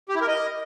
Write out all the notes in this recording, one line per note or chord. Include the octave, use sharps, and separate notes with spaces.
G4
E4
A#4
D#5